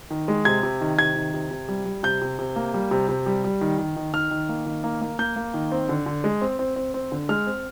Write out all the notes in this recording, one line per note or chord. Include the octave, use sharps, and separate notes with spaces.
D#3
G#3
C3 G#6
C3
D#3
C3 G#6
D#3
C3
C3
G3
G3
C3 G6
C3
C3
A#3
G3
C3
C3
G3
G3
D#3
D#3
D#3
D#3 F6
D#3
A#3
D#3
A#3
A#3
A#3 G6
A#3
D#3
C4
D3
D3
G#3
C4
C4
C4
C4
D3
G#3 F6
C4